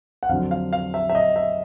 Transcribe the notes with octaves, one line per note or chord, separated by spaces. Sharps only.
F#5
F2 D3 F#3 F5
F5
F5
E5
E5
D#5
E5